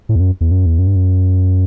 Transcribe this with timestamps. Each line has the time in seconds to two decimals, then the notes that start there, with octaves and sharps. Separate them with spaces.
0.09 A2
0.16 E2
0.20 F#2
0.41 E2
0.51 F#2
0.66 E2
0.79 F#2
0.87 G2
0.96 F#2